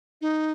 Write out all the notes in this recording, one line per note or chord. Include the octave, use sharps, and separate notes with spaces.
D#4